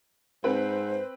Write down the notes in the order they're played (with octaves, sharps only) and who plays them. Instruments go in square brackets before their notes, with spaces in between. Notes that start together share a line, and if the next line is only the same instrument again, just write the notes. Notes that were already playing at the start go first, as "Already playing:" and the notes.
[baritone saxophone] G#2 [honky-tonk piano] C4 B4 [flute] C5